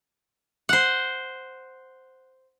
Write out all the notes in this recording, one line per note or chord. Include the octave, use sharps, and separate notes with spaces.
C5 F#5